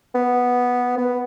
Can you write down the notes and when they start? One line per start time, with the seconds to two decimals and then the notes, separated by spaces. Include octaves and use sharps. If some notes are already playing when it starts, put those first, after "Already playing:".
0.15 B3
0.98 B3